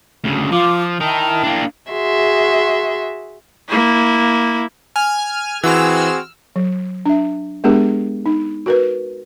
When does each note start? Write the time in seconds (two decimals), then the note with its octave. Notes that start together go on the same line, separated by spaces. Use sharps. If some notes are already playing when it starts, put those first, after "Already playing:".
0.24 D2 C#3
0.52 F3 F4 D6
1.00 D#4 E4 A#4 G5 A5
1.43 A#3 D4
1.90 F#4 G#4 E5 C6
3.69 A#3 E4
4.96 G#5 F6
5.63 E3 C4 F#4 G#4 E6 F6
6.56 F#3
7.06 D4 E5
7.64 G#3 B3 D4 G4 G#4 A#4
8.26 D#4
8.66 F#4 A#4 B4